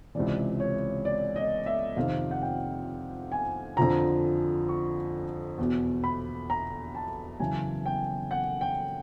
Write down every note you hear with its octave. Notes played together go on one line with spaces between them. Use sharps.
C#2 C3 E3 D5
C#5
D5
D#5
E5
F2 C3 D#3 F5
F#5
G5
G#5
F2 D3 F3 A#5
C#6
E2 B2
B5
A#5
A5
F#2 C#3 E3 G#5
G5
F#5
G5